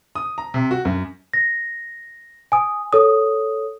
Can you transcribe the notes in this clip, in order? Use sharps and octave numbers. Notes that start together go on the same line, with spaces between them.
D#6
A#5
C3
F#4
F#2
A#6
G#5 D#6
A4 C#5 D#6